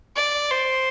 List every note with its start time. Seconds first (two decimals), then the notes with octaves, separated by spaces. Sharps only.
0.16 D5
0.51 C5